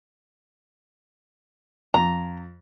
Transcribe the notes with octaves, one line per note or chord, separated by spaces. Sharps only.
F2 A#5